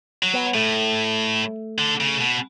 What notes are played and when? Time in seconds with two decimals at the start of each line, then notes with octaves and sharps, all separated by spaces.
0.23 F#3
0.34 B3
0.54 A2 A3
1.78 D3
2.00 C#3
2.21 B2